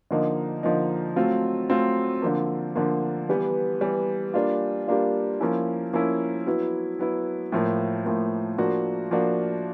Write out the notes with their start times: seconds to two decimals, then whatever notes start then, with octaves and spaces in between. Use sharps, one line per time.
0.11 D3 F3 A#3 D#4
0.63 D3 F3 A#3 D#4
1.16 F#3 A3 C4 F4
1.70 F#3 A3 C4 F4
2.22 D3 F3 A#3
2.75 D3 F3 A#3
3.29 E3 G3 B3
3.81 E3 G3 B3
4.34 G3 A#3 D4 F4
4.88 G3 A#3 D4 F4
5.40 F3 A#3 C#4 E4
5.93 F3 A#3 C#4 E4
6.47 F#3 B3 E4
6.99 F#3 B3 E4
7.52 A2 F3 A#3
8.05 A2 F3 A#3
8.58 F3 A#3 D4 F#4
9.11 F3 A#3 D4 F#4